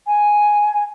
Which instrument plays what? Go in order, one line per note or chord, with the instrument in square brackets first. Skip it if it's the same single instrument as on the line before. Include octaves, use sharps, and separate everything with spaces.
[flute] G#5